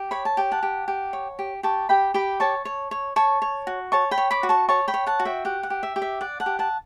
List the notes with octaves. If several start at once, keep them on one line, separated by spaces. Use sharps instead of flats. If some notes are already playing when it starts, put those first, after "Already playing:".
Already playing: G4
C#5 B5
A5
G4 G5
F#5 A5
G4
G4
C#5
G4
G4 A5 C#6
G4 G5 B5
G4 G5 B5
C#5 A5 C#6
C#5
C#5
C#5 A5 C#6
C#5
F#4
C#5 A5 C#6
G5 B5
C#5
B5 D6
F#4
A5 C#6
C#5 A5 C#6
G5 B5
C#5
F#5 A5
F#4
E5 G5
G4 F#5
F#5
G4
E5
G4
E5
D5 F#5
F#5 A5
G4
F#5 A5